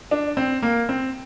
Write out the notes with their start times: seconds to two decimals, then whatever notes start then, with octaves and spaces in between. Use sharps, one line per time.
0.11 D4
0.37 C4
0.62 A#3
0.89 C4